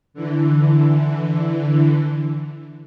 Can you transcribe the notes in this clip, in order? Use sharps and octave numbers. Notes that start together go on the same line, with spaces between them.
D3 E3